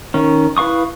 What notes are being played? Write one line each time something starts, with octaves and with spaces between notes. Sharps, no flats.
D#3 C#4
E4 B4 F5 C#6 D#6